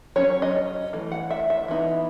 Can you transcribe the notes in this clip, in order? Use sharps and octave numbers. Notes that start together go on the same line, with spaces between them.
F#3 C#4 C#5
D#5
E3 A3
F#5
E5
E5
E3 B3 D#4